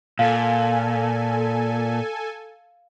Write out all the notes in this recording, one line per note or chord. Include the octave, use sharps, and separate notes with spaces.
A#2 A4 F5 G#5